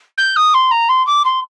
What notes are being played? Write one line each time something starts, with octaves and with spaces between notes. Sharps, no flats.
G6
D#6
C6
A#5
C6
D6
C6